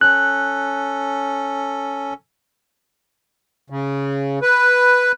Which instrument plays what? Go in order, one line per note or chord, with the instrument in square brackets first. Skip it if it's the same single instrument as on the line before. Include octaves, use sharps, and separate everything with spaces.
[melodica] C#4 A4 [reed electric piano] F#6
[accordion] C#3
B4